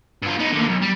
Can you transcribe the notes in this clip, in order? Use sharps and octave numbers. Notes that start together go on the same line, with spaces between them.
G2 F4
B3 D#4
D#2 D3
B1
G3